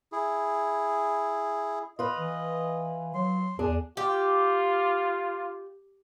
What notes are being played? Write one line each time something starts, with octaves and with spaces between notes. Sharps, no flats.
E4 G#4
F4 B4 D#5
E3
F#3 C6
E2 D4 G#4
F4 G4